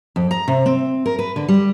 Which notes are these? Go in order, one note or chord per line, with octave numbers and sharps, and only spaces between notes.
F2
A#5
C3
C4
A#4
B4
D3
G3